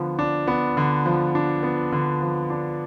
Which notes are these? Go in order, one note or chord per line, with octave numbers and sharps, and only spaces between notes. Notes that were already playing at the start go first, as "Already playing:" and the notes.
Already playing: D3 F3 B3
D4
B3
D3
F3
D4
B3
D3
F3
D4